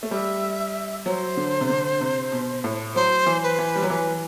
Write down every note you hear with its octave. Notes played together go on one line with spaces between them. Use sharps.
A3
G3 E5
F#3 C5
D3
C3
D3
C3
B2
A2
F#3 C5
E3
B4
E3
G3
F#3
E3 B4